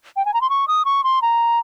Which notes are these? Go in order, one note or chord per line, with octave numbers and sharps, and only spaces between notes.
G5
G#5
A#5
C6
C#6
D#6
C#6
C6
A#5